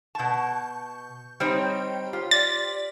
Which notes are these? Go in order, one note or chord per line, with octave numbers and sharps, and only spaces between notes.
B2 A5 C#6 G6
G3 C4 D#4 C5 C#5 G5
F4 G4
D5 A6 B6